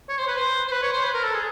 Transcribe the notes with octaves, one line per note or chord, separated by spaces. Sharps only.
C#5
C5
B4
C5
C5
B4
C#5
C5
B4
A#4
A4
G#4